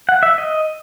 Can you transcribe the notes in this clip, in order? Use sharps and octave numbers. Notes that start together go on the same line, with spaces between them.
F#5
E5
D#5